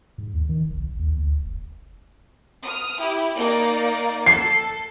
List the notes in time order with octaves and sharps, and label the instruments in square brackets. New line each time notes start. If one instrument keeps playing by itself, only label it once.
[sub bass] G#2
D#2
D#3
F1
B1
G1
D#2
D2
F1
[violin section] D#6 F6
E4 G4
A#3 D#4 D5
[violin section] A4 [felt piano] C7